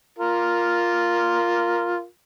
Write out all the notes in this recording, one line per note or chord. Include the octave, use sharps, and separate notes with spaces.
F4 A#4